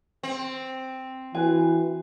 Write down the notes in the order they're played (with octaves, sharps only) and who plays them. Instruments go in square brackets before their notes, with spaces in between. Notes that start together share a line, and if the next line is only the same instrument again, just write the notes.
[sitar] C4
[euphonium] E3 [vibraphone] F#4 [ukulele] B4 G#5